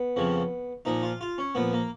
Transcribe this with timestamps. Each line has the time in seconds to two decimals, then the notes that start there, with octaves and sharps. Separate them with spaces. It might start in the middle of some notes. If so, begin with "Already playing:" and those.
Already playing: B3
0.16 F2 C#3 F3
0.85 A#2 F3 D#4
1.03 F4
1.21 F4
1.38 C#4
1.55 A#2 F3 B3
1.73 A#3